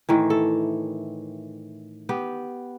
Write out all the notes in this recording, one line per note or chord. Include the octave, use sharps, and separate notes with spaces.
A2 D#3 E3
A4
B3 G4